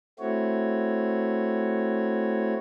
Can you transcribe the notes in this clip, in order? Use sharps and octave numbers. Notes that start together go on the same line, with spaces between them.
A3 C4 E4 F#4 C#5